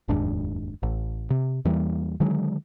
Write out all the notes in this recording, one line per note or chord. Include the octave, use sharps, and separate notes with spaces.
F1 D#2 G#2 D4
A1
C3
E2 E3 G3 A#3
D3 D#3 F#3 G#3